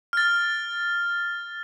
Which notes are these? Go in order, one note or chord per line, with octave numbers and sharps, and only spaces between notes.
F6 A6